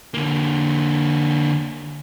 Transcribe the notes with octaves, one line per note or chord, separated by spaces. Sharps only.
D3 A#3